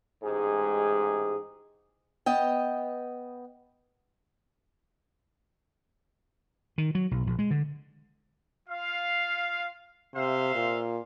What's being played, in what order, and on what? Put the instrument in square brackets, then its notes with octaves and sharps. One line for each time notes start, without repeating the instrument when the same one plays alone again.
[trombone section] A1 G#2 G#3 G4 G#4
[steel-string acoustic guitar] B3 D#5 G5
[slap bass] D#3
F#3
B1
A#1
G#3
D3
[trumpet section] F4 F5
[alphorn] C3 [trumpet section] C5 E5 F5
[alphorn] A#2